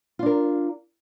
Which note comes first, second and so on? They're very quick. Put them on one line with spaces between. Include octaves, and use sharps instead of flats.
F4 D4 A#4